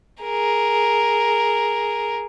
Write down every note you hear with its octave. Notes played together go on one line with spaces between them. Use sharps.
G#4 A#4